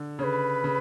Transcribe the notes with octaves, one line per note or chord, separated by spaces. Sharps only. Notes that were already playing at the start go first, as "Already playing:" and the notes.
Already playing: D3
C#3 C#5
B4
C#3